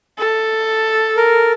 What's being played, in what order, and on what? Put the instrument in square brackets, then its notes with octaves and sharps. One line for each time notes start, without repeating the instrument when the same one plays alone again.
[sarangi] A4
[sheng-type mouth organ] A#4